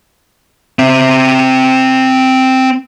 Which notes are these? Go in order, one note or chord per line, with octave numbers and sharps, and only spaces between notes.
C4 E5